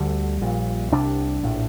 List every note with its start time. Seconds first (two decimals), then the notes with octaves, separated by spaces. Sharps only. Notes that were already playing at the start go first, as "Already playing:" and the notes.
Already playing: D2 D3 G3
0.42 A#1 A#2
0.92 C2 C3 D4
1.43 A#1 A2